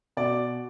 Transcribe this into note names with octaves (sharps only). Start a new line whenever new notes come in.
B2 D5